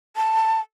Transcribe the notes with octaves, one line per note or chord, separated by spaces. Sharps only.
A5